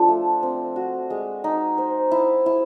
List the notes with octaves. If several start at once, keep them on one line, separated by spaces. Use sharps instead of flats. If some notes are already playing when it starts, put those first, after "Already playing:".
Already playing: F3 D4 A4
A3
C4
F#4
G#3
D#4
C5
E4
E4